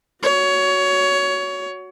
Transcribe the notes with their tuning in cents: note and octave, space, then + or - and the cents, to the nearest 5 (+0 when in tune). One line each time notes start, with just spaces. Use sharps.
F#4 +0 C#5 +20